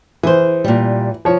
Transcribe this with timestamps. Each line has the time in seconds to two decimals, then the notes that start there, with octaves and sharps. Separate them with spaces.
0.23 E3 G#4 C5
0.64 A#2 G3
1.25 F3 C#5